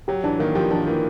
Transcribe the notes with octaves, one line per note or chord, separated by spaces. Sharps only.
F#3 G4
E3 D4
D#3 A#3
F3 G4
F3 D4
E3 A#3